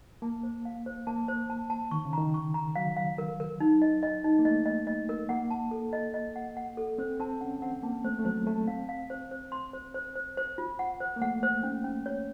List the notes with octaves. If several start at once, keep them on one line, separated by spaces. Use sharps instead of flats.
A#3 A5
C5
F5
C5
A#3 A5
C5
A5
A5
D#3 C#6
C#3
D#3 A#5
C#6
A#5
F#3 F5
F5
A#4
A#4
D#4
D#5
D#5
D#4
A#3
A3 D#5
D#5
D#5
A#4
A#3 F#5
A5
A4
D#5
D#5
F#5
F#5
A4
C4 C5
C4 A5
C#4 F#5
C4 F#5
A#3 A5
A3 C5
A3
F#3 C5
A3 A5
C4 F5
F5
C5
C5
C6
C5
C5
C5
C5
F4
F#5
C5
A#3
A3 F#5
C5
C#4
C#4
C#5